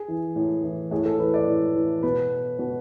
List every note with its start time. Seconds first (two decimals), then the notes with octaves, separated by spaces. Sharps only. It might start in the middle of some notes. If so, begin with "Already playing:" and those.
Already playing: G#4
0.08 E3
0.36 A2
0.63 E3
0.91 A2 G#4
1.05 A4
1.19 E3 B4
1.34 D5
1.47 A2
1.76 E3
2.03 B2 B4
2.59 B2